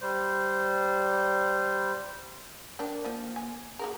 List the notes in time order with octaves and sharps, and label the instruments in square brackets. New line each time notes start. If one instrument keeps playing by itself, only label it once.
[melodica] G3 C5
[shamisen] A#3 D4 G5 [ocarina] A#4
[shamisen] F3 F4 [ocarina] A#3
[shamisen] G#5
[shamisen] A#3 F#4 A#4 [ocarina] G#4